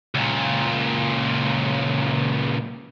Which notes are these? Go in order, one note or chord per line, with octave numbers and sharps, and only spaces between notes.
C#2 A#2